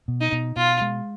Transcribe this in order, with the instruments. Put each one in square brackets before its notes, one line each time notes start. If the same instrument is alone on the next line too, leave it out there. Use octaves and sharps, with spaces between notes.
[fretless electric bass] B2
[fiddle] D#4
[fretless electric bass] B2
[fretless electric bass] B2 [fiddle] F4
[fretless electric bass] G#3